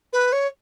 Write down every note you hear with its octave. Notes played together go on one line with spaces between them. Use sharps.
B4
C#5